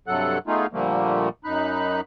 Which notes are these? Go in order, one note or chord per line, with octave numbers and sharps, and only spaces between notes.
G2 C3 F#3 A4 F#5 F#6
A3 B3 D#4 F4 G#4
A#2 D3 F3 G3 A3 A#3
F#2 D#4 B5 F#6